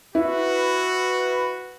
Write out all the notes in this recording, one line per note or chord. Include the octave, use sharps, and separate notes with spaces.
E4 F#4 B4